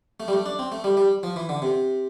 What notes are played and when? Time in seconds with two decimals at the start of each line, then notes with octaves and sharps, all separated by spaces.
0.20 A3
0.28 G3
0.33 A3
0.46 D4
0.59 C4
0.72 A3
0.84 G3
0.97 G3
1.23 F3
1.36 E3
1.49 D3
1.62 C3